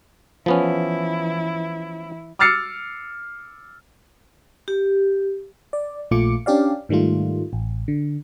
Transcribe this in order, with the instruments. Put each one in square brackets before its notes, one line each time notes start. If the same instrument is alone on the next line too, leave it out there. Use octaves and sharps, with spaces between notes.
[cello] E3 E4 [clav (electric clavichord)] F3 B3 C#4
[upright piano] D6 E6 F6 A6 C7 C#7
[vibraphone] G4
[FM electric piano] D5
A#1 A#2 A3 F4 D6 C#7
C#4 D4 G4 D5 F5
G#2 D#3 G3 A3 F4
A1
D3